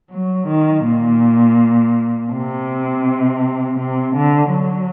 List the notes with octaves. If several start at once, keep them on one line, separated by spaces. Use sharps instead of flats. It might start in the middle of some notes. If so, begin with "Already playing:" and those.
F#3
D#3
A#2
C3
C3
D3
F#3